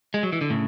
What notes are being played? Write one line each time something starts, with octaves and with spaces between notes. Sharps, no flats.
G#3
F#3
E3
D3
A2 C#3